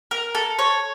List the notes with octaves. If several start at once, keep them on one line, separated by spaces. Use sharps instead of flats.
A#4
A4
C#5